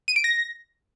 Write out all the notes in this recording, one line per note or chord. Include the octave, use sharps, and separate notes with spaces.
D#7
D7
A#6